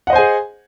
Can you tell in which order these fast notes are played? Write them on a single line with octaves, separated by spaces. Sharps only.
F#5 D#5 C5 G#5 G#4